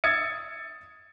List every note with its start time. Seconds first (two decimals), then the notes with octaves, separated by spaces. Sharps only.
0.04 D#6 E6 G#6 A6 C#7